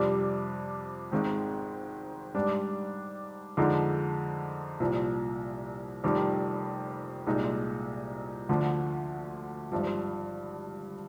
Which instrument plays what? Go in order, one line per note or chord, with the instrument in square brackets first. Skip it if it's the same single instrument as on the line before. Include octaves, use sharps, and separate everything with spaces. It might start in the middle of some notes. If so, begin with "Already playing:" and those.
Already playing: [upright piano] F2 C3 G3 D4
G#1 G#2 D#3 G#3 C4
G#2 G3 D4
F2 D3 F3 G#3 D#4
C2 A#2 F3
F1 F2 D#3 G3
C2 A#2 G#3 D#4
D2 D3 F3
G#1 G2 F3